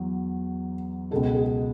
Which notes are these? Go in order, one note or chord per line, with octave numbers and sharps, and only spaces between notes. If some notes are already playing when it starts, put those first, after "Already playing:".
Already playing: E2 F#3
C#2 B2 G#3 A4
G#4